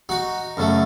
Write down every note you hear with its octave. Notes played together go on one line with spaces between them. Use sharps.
D#4 F#4
F#2 C#3 A3